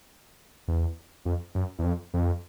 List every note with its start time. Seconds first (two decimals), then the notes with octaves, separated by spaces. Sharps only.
0.68 E2
1.25 F2
1.55 F#2
1.79 E2
1.84 F2
2.14 F2